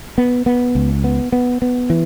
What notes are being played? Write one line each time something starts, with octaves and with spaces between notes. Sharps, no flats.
B3
B3
C#2
B3
B3
B3
E3